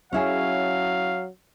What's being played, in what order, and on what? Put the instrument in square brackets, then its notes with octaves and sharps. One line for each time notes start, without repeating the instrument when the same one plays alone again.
[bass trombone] F#3 [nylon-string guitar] C#4 E4 G#4 [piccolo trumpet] F5